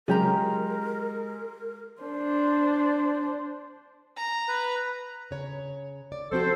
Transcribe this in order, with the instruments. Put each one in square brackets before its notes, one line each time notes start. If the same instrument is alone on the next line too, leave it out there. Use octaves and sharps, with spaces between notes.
[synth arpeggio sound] C#3 F#3 [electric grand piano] G#3 [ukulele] F4 G4 A#5 [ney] A#4
[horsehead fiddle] D4 C5
[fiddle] A#5
[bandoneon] B4
[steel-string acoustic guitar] C#3 C#5 A#5
D5
[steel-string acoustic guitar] F3 C4 F#4 [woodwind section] A4 C5